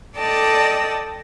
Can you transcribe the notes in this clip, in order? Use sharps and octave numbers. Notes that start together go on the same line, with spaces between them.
A4 D5 D#5 G5 A5